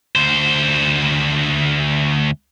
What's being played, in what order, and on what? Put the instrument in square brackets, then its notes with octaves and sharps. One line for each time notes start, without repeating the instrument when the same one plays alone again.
[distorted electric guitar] D2 C5